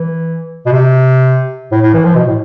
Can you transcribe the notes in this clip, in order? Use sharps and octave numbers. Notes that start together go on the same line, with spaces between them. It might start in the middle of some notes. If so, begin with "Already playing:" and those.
Already playing: E3
B2
C3
A2
A2
E3
F3
B2
A2